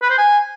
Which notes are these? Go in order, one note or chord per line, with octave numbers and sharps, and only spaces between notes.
B4
C5
G#5